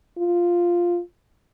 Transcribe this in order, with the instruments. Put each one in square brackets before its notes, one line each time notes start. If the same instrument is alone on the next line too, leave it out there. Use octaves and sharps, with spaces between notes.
[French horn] F4